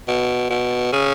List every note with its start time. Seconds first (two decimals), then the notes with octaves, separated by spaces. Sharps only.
0.08 B2
0.50 B2
0.92 C#3